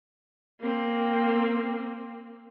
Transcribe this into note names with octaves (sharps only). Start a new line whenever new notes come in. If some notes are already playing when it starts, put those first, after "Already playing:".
A#3 C4